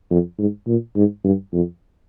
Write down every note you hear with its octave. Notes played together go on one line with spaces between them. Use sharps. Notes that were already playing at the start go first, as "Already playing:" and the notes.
F2
G#2
A#2
G#2
G2
F2